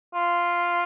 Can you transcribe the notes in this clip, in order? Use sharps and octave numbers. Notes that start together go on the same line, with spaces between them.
F4